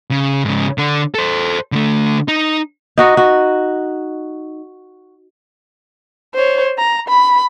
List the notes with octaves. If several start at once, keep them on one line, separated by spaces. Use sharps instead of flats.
C#3
G#2 C#3
D3 D4
A4 C5
D3 A3
D#4
D#4 F#4 D#5
F#4
C5 C#5
A#5
B5